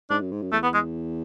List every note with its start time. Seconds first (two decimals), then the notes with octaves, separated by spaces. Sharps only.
0.10 G#2 D4
0.21 F#2
0.31 G#2
0.42 F#2
0.52 E2 A3
0.63 B3
0.74 G#3